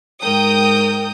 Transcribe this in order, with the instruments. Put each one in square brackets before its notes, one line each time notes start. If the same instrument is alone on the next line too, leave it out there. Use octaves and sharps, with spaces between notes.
[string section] G#2 A#4 G5 D#6 G6